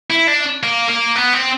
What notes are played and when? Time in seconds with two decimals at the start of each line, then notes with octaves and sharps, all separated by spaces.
0.10 E4
0.27 D4
0.63 A#3
0.89 A#3
1.16 B3
1.34 C4